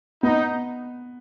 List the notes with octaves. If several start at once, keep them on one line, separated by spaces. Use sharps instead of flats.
B3 D#4